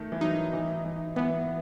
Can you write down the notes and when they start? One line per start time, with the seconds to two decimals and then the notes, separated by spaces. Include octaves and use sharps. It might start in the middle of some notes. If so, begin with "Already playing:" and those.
Already playing: D#3 A3
0.12 E3
0.21 F#3 D#4
0.53 E3
0.85 E3
1.16 E3 B3